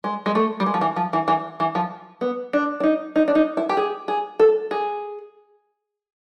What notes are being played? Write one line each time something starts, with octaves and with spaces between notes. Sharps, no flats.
G#3
G#3
A3
G3
G#3
F3
E3
F3
E3
E3
E3
F3
B3
D4
D4
D#4
D#4
D4
D#4
E4
G4
G#4
G#4
A4
G#4